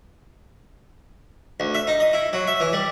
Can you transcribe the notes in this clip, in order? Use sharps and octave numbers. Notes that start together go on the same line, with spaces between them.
D2
E5
D#4
D#5
E4
F#3
E5
E3
G3